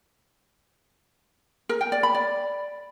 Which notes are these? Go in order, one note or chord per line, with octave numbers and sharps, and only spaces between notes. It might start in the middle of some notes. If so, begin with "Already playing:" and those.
A#4
G5
D5
B5
D5